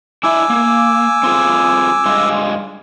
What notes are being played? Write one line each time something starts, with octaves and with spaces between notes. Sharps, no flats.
D4 E4 E5 G#5 D6 E6
A#3
C4 F4 G#4
G2 G#3 F4